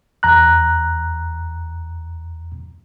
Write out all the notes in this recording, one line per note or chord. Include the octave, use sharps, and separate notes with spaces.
E2 A#5 F#6